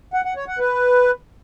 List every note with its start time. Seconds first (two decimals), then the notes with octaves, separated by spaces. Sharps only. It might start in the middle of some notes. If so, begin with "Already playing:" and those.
0.14 F#5
0.25 F#5
0.36 C#5
0.48 F#5
0.59 B4